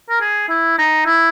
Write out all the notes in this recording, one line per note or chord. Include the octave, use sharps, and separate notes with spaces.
A#4
G#4
E4
D#4
E4